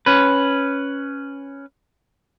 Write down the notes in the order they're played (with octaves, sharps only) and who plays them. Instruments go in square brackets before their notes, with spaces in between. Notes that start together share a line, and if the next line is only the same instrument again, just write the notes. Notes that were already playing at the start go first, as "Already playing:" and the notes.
[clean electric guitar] C#4 B4